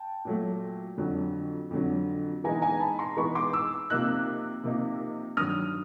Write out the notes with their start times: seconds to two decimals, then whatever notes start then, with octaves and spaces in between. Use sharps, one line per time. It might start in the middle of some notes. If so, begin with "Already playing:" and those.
Already playing: G5 A5
0.25 A#2 F#3 A3
0.98 F2 D3 F#3
1.70 F2 D3 F#3
2.44 E3 G#3 B3 D#4 G#5 A#5
2.62 G#5 A#5
2.80 A5 B5
2.99 A#5 C6
3.17 E3 G#3 B3 D#4 B5 C#6
3.35 C6 D6
3.53 D6 E6
3.90 C3 F3 A#3 D#4 E6 F#6
4.64 C3 F3 A#3 D#4
5.37 G2 D#3 F#3 D#6 F6